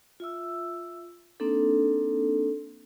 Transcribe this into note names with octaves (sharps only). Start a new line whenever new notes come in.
F4 E5 E6
A#3 C4 D4 D#4 A4